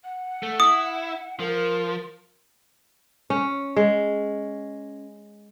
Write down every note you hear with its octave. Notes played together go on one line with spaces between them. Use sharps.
F#5
A3
E4 D#6
F3 A#4
C#4
G#3